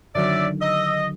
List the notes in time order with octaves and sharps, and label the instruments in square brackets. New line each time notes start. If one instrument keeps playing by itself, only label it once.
[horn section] F#2 D5 [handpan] D3 D#3 F#3 [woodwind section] E5
[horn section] D#5 [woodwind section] E6